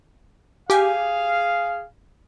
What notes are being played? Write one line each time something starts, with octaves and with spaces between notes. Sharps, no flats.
G4 G#4 F5 G#5